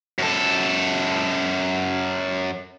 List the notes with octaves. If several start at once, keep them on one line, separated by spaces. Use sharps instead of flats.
F#2 A4